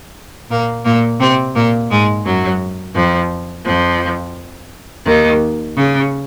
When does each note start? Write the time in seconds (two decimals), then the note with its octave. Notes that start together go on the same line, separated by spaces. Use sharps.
0.50 A#2 A#3
0.85 A#2 A#3
1.20 C3 C4
1.55 A#2 A#3
1.90 G#2 G#3
2.25 F#2 F#3
2.96 F2 F3
3.65 F2 F3
5.06 D#2 D#3
5.76 C#3